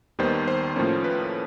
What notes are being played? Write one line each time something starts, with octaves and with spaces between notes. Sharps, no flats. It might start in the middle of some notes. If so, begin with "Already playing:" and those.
D#2 D#3 G3 B3 C5
C5
A2 F3 A#3 C#4
B4